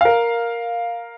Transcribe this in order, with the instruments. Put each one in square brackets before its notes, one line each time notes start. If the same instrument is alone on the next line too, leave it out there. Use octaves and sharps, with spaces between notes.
[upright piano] A#4 F5